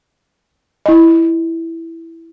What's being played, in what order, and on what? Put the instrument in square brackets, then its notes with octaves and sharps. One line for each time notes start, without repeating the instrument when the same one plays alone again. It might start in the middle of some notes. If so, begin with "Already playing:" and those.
[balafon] E4 D#5